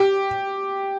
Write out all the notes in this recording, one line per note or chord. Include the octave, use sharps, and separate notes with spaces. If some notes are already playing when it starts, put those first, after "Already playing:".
Already playing: G4